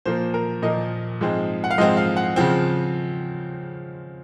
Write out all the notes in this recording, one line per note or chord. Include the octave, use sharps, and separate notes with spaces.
A#2 F3 A#3 C5
A#4
A#2 F3 A#3 D#5
G#2 F3 G#3 C4
F#5
F5
G#2 F3 G#3 C4 D#5
F5
F#5
C#3 F3 C4